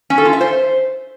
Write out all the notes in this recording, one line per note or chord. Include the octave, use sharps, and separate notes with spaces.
C#4
A4
F4
E5
C5